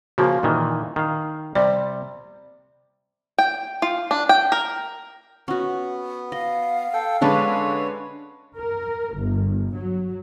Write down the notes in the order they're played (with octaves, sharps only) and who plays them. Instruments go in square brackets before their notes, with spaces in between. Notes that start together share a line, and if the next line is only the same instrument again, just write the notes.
[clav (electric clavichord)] C#3 F3 A#3 [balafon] F#4
[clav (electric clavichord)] A#2 D#3 E3
D#3 F5
[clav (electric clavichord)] C3 G3 [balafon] D5
[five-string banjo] G5
F4
D4
G5
A#4
[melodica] B3 [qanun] C#4 F#4
[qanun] D#5 [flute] F5
[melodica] A4 G5
[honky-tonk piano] D3 G#3 B4 [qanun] C#4 D4 A4 [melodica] C#5
[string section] A#4
G1
F#3